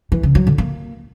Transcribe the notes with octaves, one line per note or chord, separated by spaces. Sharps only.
E3
C#3
F#3
D3
A#3